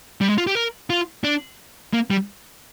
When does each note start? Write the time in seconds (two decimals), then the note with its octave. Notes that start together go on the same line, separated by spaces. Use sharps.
0.21 G3
0.29 G#3
0.38 F4
0.47 G4
0.55 A#4
0.90 F4
1.24 D4
1.93 A#3
2.11 G3